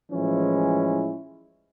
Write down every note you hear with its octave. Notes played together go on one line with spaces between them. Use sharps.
A2 E3 F3 G#3 C#4 E4